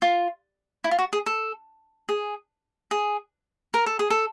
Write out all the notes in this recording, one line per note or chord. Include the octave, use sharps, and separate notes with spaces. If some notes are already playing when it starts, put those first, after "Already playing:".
F4
E4
F4
F#4
G#4
A4
G#4
G#4
A#4
A4
G#4
A4